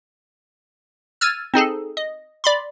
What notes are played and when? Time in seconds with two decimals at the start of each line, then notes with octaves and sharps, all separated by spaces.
1.21 E6 F6 G#6 A6 D#7
1.54 C4 D#4 G#4 A4
1.97 D#5
2.44 D5 B5 C6